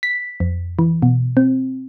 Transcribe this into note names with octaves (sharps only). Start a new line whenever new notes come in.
B6
F2
E3
B2
C4